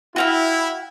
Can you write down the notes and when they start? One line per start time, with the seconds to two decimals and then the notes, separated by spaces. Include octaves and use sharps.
0.16 E4 F#4 F5 G5